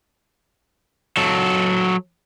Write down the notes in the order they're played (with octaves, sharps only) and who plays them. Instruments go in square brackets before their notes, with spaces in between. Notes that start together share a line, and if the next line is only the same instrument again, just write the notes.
[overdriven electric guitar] F#3 A4